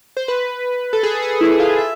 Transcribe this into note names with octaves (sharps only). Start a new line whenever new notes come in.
C5
B4
A4
G#4
G#4
E4
E4
F4
E5